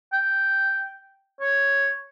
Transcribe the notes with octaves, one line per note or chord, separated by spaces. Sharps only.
G5
C#5